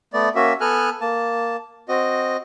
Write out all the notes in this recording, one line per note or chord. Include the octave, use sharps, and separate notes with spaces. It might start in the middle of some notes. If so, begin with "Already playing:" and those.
A3 B3 D5
A#3 C#4 F#4 E5
B3 A4 G#5 F6 F#6
A#3 A5
C4 F#4 D#5